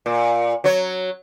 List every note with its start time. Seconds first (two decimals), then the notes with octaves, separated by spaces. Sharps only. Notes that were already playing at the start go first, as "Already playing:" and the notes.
0.06 A#2
0.64 F#3 C#5